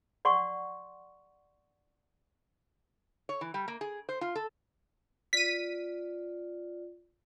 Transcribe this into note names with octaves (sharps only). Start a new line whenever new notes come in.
D5 F#5 C6 C#6
C#5
E3
G3
A#3
G#4
C5
F4
A4
F4 D5 B6 D#7